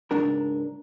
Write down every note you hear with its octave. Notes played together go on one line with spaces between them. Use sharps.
C#2 G#2 D4 A#4